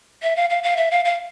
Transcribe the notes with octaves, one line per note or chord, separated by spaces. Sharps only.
E5
F5
F5
F5
E5
F5
F5